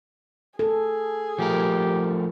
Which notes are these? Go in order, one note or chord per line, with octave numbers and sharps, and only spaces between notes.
G#4 A4
F3 A3 G4 A#4